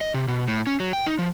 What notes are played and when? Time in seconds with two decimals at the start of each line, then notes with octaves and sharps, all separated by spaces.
0.01 D#5
0.14 C3
0.28 B2
0.48 A2
0.67 C#4
0.80 F#3
0.93 G5
1.06 D#4
1.19 F3